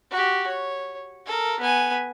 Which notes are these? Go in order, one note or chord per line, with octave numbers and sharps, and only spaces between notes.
F#4 G4
C#5
A4 A#4
B3 G#5